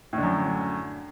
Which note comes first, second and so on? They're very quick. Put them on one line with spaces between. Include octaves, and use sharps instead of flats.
A2 D3 F#2